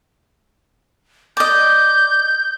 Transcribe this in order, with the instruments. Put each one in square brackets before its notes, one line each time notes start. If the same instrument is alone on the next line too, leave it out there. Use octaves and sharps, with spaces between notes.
[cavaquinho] D5 D#5 [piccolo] G6